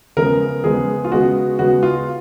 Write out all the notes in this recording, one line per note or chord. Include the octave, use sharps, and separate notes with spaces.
C#3 F3 G#3 B3 A#4
C#3 F3 G#3 B3 G#4
F4
C#3 G#3 B3 F#4
C#3 G#3 B3 F#4
F4